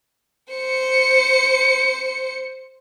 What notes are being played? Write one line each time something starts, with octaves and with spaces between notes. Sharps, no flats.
C5 C#7